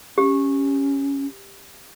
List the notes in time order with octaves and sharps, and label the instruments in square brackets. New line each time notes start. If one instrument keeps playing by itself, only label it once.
[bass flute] C#4 [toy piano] G4